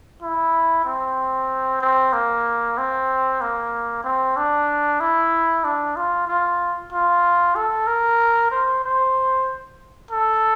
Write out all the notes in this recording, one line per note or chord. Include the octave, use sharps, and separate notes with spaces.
E4
C4
C4
A#3
C4
A#3
C4
D4
E4
D4
F4
F4
F4
A4
A#4
C5
C5
A4